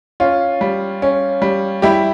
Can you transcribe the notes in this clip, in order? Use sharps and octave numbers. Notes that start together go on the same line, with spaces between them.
C#4 F4
G3
C#4
G3
G3 E4 G4